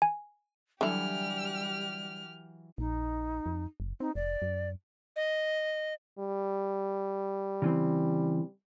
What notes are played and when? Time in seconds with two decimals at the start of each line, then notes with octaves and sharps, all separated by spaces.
0.02 G#5
0.81 D3 E3 F#3 G3 E4 G4 F6
2.78 A#1 D#4
3.46 F2
3.80 F#1
4.00 C4 D#4
4.15 F1 D5
4.42 F#2
5.16 D#5
6.19 G3
7.62 C#3 E3 C4